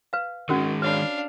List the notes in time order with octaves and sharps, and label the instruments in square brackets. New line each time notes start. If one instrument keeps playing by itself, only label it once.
[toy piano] B4 F5
[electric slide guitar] D#3 G#3 [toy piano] C#4 F#4 A#4
[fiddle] D4 F5 [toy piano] B4 C#5 B5